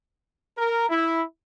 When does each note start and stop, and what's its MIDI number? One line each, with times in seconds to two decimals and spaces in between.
0.57 0.86 70
0.89 1.22 64